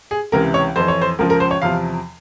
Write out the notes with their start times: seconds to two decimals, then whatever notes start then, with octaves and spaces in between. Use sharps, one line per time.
0.11 G#4
0.32 C#2 C3 E3 A#4
0.54 C#5
0.76 F2 E3 C5
0.88 C#5
1.02 C5
1.19 C#2 C#3 F3 A#4
1.30 A#4
1.40 C5
1.51 C#5
1.62 E2 C3 F3 F5